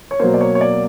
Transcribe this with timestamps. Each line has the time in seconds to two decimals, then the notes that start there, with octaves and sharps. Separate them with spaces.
0.11 C#5
0.19 B2 F#3 A#3 C5
0.34 D5
0.41 C#5
0.55 C#5
0.61 D5